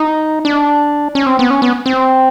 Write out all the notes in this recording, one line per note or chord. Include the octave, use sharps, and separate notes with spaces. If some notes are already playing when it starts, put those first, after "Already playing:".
Already playing: D#4
D4
C#4
C4
B3
C#4
B3
C4